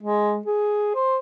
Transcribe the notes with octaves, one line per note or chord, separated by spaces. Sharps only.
G#3
G#4
C5